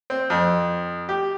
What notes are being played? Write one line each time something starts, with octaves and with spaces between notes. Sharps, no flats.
C4
F2
G4